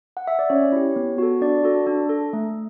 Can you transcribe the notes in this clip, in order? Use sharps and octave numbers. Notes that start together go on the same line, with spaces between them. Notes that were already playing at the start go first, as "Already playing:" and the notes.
F#5
E5
D5
C#4 C#5
E4 G4
B3
F#4 A4
D4 D5
F#4 A4
D4
A4
A3